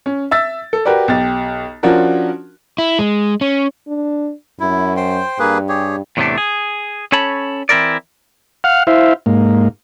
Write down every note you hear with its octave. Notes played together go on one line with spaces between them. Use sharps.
C#4
E5 E6 A6
A4
F#4 G4 A#4 B4 D5
B1 G4 A6
F3 C#4 D4 F4 F#4 A#4
E4
G#3
C#4
D4
F#2 E4
C5 G5 C6
G2 A#3 G#4 B4
G4 G#4 C#5
E2 A2 C3 E3 A3 D4
G#4
C#4 A4 C#5 A5 B5
E3 C4 E4 A#4 D5
F5 F#5 F6
E4 C5 E5 F5
G#2 A#3